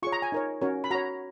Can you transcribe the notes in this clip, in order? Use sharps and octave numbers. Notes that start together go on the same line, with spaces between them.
F4 G#4 C#5 C#6
A#5
G#5
D#4 A#4 C#5
C#4 F#4 A#4 C#5
B5
F#4 C#5 A#5